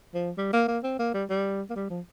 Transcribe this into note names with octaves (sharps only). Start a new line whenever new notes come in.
F3
G3
A#3
A#3
C4
A#3
G3
G3
A#3
G3
F3